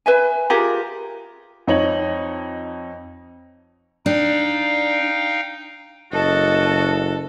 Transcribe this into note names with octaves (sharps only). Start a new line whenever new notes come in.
B4 E5 G#5
F4 G4 G#4 A#4
F2 D#4 C#5 F#7
D4 D#4 F5 G5
F#1 F#4 A4 D#5 A5